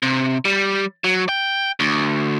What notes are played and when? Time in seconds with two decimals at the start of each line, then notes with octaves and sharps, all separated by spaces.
0.03 C3
0.45 G3
1.04 F#3
1.29 G5
1.80 D2